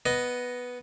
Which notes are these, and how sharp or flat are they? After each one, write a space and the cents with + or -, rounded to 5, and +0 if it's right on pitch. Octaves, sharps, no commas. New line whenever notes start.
B3 +0 D#5 +0